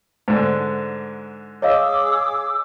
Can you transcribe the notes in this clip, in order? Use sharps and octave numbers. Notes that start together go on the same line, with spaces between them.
G#2 D3
G#4 C#5 D#5 F5 D6 E6